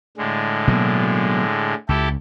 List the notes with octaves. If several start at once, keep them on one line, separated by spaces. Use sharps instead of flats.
A2 D3 G#3
B2 F#3 A#3
C#2 E4 G4 A4